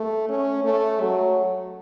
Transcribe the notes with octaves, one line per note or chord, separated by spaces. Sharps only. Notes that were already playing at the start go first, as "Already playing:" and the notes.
Already playing: A3
C#4
A3
F#3